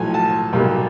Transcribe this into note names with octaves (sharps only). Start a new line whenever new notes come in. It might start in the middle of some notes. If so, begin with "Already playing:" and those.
Already playing: B1 A2 F3 G#5
A5
B1 B2 G3 A#3